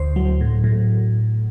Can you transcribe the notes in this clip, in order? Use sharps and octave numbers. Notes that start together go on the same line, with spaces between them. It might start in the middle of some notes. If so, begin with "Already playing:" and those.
Already playing: D2 C5
F#3
A2
A2